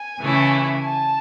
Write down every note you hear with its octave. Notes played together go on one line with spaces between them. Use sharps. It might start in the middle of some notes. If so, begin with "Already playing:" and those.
Already playing: G#5
C#3 E3 A3 E4
A5